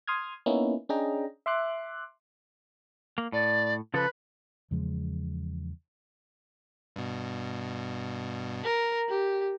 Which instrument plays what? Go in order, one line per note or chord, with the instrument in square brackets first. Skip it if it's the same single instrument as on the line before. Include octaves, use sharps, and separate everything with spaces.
[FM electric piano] C6 D#6 F6 G#6
A#3 B3 C#4 D#4 E4
C#4 D4 G#4 D#5 G5 A#5
E5 C6 D6 F#6
[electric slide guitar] A#3
[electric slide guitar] A2 [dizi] D5
[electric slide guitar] C#3 F3 A4 [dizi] B4
[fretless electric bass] E2 C#3 F3 G#3
[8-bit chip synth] G2 B2
[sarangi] A#4
G4